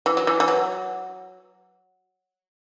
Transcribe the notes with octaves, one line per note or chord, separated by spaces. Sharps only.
E3
F#3
E3
E3
F#3